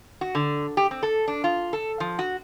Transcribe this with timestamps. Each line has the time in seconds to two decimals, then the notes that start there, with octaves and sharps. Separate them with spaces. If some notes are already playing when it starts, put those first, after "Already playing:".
0.21 F#4
0.35 D3
0.77 G4
0.91 C4
1.03 A4
1.28 D4
1.44 F4
1.73 A4
2.00 F3
2.19 F#4